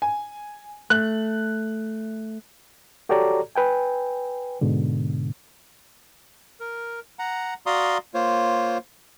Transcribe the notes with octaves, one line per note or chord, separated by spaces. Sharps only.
G#5
A3 F#6
F#4 G4 A4 C#5 D5 A#5
B4 G5 G#5
G#2 B2 D3
A#4
F#5 A#5
F#4 D5 F5 A#5 C6 D#6
A#3 F4 C5 C#5